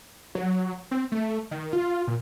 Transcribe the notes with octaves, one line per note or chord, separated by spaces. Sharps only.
F#3
C4
A3
D#3
F4
A#2